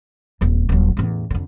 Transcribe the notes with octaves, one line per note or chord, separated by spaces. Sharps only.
D#1 F2
D#1 F#3
A1 E2
F2 D3